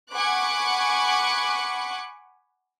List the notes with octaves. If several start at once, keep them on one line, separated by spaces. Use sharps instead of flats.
F#5 G#5 B5 C#6 D6 F#6